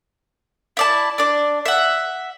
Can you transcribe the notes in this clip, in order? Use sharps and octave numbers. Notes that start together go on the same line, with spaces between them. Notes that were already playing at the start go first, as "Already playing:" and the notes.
E4 D5 A5
D4 D5
E5 F#5